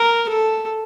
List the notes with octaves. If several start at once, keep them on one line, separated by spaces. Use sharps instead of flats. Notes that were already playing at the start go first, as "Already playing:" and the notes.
Already playing: A#4
A4